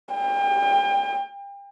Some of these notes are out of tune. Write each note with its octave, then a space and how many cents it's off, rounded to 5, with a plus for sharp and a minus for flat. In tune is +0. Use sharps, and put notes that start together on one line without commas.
G5 +35